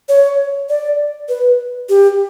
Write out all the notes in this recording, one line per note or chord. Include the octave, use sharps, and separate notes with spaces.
C#5
D5
B4
G4